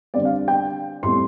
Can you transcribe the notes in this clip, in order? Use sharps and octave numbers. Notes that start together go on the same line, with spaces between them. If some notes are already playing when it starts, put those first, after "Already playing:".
D3 G3 C4 D5
F5
G5
A2 G3 C4 C6